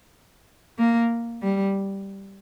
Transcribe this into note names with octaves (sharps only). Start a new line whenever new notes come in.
A#3
G3